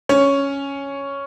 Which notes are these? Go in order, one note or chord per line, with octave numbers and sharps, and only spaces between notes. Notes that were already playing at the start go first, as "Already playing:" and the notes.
C#4 C#5